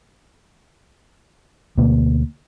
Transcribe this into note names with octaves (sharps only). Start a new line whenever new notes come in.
D2 B2 A#3